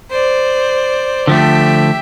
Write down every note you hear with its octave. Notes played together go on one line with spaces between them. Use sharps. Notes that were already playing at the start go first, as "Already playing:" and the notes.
C5 D5
D3 F3 A3 G4 E5